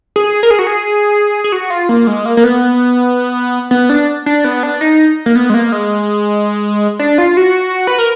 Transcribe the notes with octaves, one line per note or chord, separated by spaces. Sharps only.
G#4
A#4
G#4
F#4
G#4
G#4
F#4
F4
A#3
G#3
A#3
A#3
B3
B3
D4
D4
B3
D4
D#4
A#3
B3
G#3
A#3
G#3
D4
F4
F#4
B4
A#4